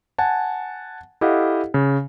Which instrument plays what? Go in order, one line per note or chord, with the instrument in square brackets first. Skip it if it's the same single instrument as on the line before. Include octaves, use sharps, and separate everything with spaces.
[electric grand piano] F#5 G#5 A5
E4 G4 A4 D#5 F5 F#5
C#3